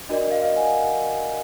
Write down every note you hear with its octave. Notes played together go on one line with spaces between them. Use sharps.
D4 F#4 A#4 D5 D#5
D#5 F5
D#5 F5
F#5 G#5